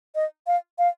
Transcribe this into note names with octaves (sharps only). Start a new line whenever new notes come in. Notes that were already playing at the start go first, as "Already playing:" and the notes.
D#5
F5
F5